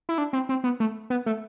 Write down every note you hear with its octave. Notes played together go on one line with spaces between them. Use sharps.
E4
D4
C4
C4
B3
A3
B3
A3